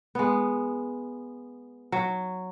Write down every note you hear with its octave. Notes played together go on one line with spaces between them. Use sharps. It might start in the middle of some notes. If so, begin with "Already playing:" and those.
G#3 B3
F#3